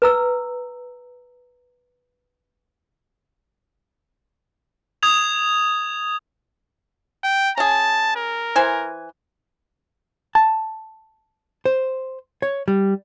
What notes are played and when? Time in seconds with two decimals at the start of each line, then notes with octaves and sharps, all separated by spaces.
0.02 B4 A#5 E6
5.03 D#6 G#6 F7
7.24 G5
7.58 C#4 G#4 A5
8.16 A#4
8.56 E3 C5 G#5
10.35 A5
11.65 C5
12.42 C#5
12.68 G3